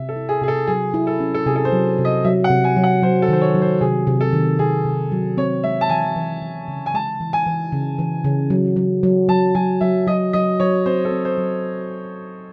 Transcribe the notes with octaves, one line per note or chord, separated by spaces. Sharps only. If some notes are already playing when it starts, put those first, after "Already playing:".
Already playing: C3 E5
A4
E4
G#4
C3 G#4
A4
F#3 G#4
E4
A4
C#4
A4
C3 G#4
A4
C5
F#3
C3
D#5
F#3 E5
F#5
C3
G#5
F#3
F#5
F#3 C5
A4
D#3 C5
C#5
F#3
C5
C3 G#4
C3
A4
D#3
C3 G#4
C3
F#3
C4 C#5
G#3 E5
A5
E3 G#5
E3
E3
C#3
G#5
G#3 A5
E3
G#5
E3
C#3
E3
C#3
F#3
F#3
F#3
F#3 A5
F#3 G#5
F#3 E5
F#3 D#5
F#3 D#5
F#3 C#5
C4 C5
A4
C4
C5
F#3